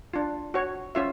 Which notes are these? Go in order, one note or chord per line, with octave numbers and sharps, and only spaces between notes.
D4 F4
F#4 C#5
C#4 F4 E5